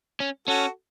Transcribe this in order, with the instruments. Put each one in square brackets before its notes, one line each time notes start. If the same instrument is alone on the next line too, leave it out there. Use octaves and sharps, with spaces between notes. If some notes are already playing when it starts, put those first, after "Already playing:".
[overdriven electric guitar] C#4
[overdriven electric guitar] C#4 [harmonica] F#4 A4